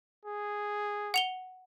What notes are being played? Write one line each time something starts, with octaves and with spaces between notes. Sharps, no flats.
G#4
F#5 F7 G7